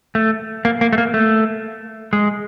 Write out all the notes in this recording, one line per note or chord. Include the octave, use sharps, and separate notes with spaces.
A3
A#3
A#3
A3
A#3
A3
G#3